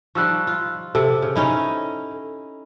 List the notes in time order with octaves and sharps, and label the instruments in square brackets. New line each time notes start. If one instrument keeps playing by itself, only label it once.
[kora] F3 G3 D#4 [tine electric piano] C#6 E6 F#6
[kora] F4
[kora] C3 [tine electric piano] A4
[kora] C#3
C#4 D#4 E4